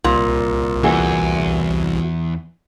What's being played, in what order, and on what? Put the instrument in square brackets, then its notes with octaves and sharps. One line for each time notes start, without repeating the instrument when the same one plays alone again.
[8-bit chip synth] C2 [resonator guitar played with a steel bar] A#2
[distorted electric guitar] E2 [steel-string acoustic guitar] E3 F#4 G#4